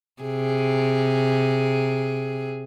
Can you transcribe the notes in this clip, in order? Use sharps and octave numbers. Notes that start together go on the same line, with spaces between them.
C3 G#4